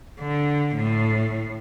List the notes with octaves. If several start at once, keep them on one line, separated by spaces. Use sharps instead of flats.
D3
A2